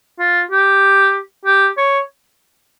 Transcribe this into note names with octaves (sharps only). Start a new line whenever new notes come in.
F4
G4
G4
C#5